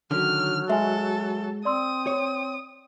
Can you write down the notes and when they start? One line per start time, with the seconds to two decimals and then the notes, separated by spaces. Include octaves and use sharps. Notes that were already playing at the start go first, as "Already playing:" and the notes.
0.11 D3 D#3 F#3 C#4 F6
0.69 G#3 A4 E5 G#5
1.65 C4 D5 C6 D#6 E6
2.07 C#5